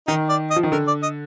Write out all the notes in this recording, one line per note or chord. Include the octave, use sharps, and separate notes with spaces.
D#3 D#4
D5
D#5
F3
D#3
D3 A#4
D5
D#5